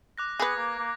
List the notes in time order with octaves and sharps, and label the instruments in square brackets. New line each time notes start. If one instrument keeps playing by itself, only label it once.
[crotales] D6 F#6 A#6
[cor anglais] B3 [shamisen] G#4 B4 [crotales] D6 G#6 A#6
[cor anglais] A#3
A#3